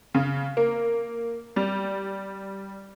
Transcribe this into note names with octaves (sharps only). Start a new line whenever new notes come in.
C#3
A#3
G3